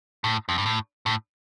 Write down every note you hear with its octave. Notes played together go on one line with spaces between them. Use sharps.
A2
F2
G2
A2
A2